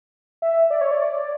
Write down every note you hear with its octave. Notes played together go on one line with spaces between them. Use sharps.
E5
D5
C#5
D5